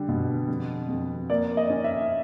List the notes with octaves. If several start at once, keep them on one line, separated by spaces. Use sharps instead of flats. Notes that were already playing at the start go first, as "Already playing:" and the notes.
Already playing: D3 G3
B2
F2
F2
A#3 D5
D#5
C#4
E5